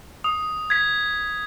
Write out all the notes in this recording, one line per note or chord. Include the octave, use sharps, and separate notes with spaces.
D#6
G#6 B6